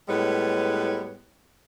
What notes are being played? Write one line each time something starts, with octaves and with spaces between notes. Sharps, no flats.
A2 G3 G#3 B3 B4 C#5